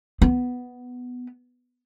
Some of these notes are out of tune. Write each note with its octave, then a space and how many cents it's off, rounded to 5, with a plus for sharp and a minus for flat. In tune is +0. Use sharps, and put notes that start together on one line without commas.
B3 +5